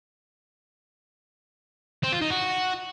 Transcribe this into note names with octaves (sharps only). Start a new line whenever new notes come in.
C4
F4
D#4
F#4